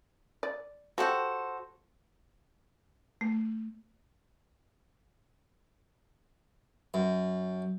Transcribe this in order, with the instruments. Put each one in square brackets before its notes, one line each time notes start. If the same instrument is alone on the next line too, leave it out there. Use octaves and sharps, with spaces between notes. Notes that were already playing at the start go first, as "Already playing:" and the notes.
[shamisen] D5
[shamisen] F3 G4 [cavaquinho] F#4 A4 C5
[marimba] A3
[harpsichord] F#2